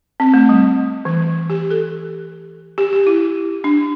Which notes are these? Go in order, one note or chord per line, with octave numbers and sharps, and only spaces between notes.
C4
A3
G3
E3
G4
A4
G4
G4
E4
D4